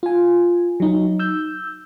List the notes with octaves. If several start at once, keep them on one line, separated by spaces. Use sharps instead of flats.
F4 G#5
F#3 D#4
E6 G6